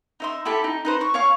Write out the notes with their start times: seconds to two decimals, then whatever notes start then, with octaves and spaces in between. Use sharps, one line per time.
0.20 D#4 E5 C6
0.45 E4 G4 A4
0.64 D#4
0.85 D#4 B4 C5
1.01 C#6
1.14 C#5 F5 C#6